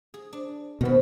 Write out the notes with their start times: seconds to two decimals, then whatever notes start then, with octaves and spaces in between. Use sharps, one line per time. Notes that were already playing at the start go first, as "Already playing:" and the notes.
0.14 G#4
0.33 D4
0.81 B2 D#3 B3 C4